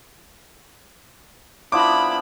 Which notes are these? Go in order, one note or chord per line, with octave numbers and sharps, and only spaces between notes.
F3 B3 D4 E4 B5 D6